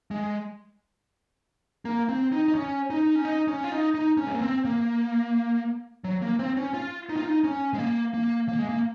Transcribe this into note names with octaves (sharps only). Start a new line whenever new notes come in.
G#3
A#3
C4
D#4
D#4
C#4
D#4
C#4
D#4
C#4
F4
D#4
D#4
C#4
G#3
A#3
C4
A#3
F#3
A#3
C4
C#4
F4
D#4
F4
D#4
C#4
G#3
A#3
A#3
A#3
G#3
A#3